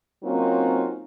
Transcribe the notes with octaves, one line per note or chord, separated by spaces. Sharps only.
F#3 A#3 C4 C#4 D#4 F4